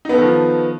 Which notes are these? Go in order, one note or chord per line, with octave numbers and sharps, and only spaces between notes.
D#3 F3 B3 D#4 A4